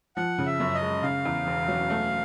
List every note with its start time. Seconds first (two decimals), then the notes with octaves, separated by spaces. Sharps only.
0.17 F3 F#5
0.38 C#3
0.46 E5
0.60 F#2
0.75 D#5
0.81 G#3
1.03 C#3 F5
1.25 E2
1.46 E1
1.68 F#3
1.90 A3